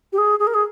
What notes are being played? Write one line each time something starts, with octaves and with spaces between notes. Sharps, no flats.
G4
G#4
G#4
A#4
G#4